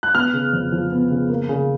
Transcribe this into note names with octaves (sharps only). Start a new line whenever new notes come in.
F#6
B3 F6
C#3
F2
F3
B3
C#3
A#3
C#3